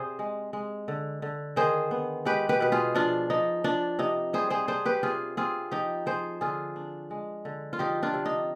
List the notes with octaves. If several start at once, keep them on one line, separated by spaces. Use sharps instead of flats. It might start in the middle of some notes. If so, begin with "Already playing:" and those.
Already playing: C3 G#4 C5 D5
G#3
G#3
D3
D3
D#3 G#4 C5
B3
G#3 G4 B4
G4 B4
B2 B4
F4 G#4
F3 D4 F4
F3 D#4
F3 D4
C3 D#4
G3 G#4 C5
G#4 C5
D4 G#4 C5
G4 B4
C3 F4 G#4
C4 F4 G#4
F3 D#4 G4
F3 G#4 C5
D3 F4 G#4
D4
G#3
D3
F4
F3 D#4 G4
D4 F4
C3
D#4